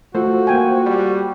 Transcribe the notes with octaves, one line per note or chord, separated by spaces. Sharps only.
A3 F4 F#4 A4 C5
A#3 G5 G#5
G3